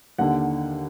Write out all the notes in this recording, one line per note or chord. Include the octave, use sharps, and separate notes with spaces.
D#2 D3 F#5